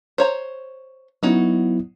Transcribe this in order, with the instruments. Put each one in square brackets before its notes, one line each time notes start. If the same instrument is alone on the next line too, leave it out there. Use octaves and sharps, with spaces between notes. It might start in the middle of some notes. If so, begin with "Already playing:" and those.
[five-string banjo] C5 C#5 A#5
[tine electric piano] F#3 B3 E4 [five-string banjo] C#4 D#4 F#4